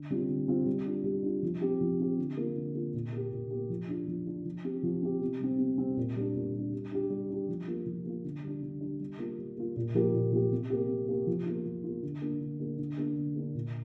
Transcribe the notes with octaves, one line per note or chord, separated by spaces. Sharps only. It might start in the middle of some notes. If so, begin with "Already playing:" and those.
Already playing: D3
G3 C4 F4
D3
G3 C4 F4
G3
D4 F4
G3
D4 F4
F3
C4 G4
F3
C4 G4
D3
A#3 F4
D3
A#3 F4
A#2
A#3 G4
A#2
A#3 G4
F3
D4 F4
F3
D4 F4
F3
C4 G4
F3
C4 G4
C3
G3 C4
C3
G3 C4
A#2
G3 D4
A#2
G3 D4
G3
D4 G4
G3
D4 G4
F3
A#3 F4
F3
A#3 F4
D3
G3 D4
D3
G3 D4
G3
A#3 F4
G3
A#3 F4
A#2
F3 A#3 G4
A#2
F3 A#3 G4
C3
A#3 G4
C3
A#3 G4
F3
A#3 F4
F3
A#3 F4
D3
A#3 D4
D3
A#3 D4
D3
A#3 D4
D3
A#3 D4
A#2